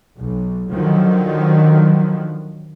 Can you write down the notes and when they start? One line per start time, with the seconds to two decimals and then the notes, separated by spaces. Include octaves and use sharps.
0.19 B1
0.70 D3 D#3 F3 F#3